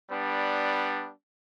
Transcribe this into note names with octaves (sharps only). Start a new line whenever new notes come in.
G3 B3 D4